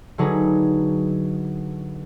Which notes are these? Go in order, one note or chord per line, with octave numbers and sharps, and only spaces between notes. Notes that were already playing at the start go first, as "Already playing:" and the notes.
D3 F#3 D#4 G#4 B4